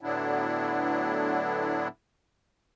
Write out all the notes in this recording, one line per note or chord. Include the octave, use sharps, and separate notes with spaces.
A2 D3 F#3 B3 D4 E4